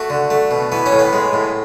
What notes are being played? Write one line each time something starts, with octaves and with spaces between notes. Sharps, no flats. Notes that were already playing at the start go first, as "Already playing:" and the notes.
Already playing: A3 F#4
D3
A3
B2
E3 B3
C#4
A2
B3
G#3
A2